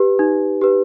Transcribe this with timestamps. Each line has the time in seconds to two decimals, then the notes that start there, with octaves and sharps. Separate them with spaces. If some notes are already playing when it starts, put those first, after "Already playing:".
Already playing: G4 B4
0.19 D#4
0.61 G4 B4